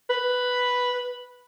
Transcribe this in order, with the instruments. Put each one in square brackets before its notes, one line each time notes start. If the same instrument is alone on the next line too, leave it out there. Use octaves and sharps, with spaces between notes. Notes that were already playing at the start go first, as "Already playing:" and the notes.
[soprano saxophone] B4